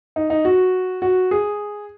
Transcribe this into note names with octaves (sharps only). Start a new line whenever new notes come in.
D#4
D#4
F#4
F#4
G#4